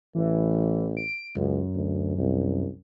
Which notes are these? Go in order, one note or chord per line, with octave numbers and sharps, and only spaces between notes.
A1 E3
D7
C#2 F#2
D2
C2